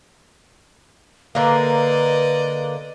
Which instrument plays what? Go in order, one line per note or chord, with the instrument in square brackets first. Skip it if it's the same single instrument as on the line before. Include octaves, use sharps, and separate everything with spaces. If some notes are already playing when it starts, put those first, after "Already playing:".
[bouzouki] D3 A#3 [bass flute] B4 [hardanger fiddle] D5 D#5